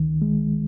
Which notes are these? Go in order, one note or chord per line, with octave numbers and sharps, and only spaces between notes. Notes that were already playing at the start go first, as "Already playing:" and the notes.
Already playing: C#2 D#3
G#3